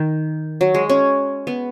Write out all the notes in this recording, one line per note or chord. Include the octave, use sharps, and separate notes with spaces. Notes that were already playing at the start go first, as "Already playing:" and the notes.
Already playing: D#3
F#3
G#3
C#4
B3